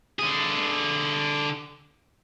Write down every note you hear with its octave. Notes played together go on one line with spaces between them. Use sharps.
D3 G#4